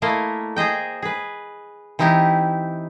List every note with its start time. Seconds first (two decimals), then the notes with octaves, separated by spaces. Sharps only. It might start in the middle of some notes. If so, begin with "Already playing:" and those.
0.02 A3 A#3 E4 D#5 F5
0.56 G#4 C5 D#5 G5
1.02 G#4 B4
1.99 E3 C4 D#4 E4 G4